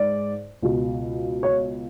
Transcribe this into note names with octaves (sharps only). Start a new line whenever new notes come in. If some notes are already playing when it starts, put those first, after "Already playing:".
Already playing: G#2 D5
C#2 B2
C#5